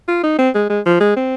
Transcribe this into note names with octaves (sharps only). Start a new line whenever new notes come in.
F4
D#4
C4
G#3
G#3
F3
G#3
C4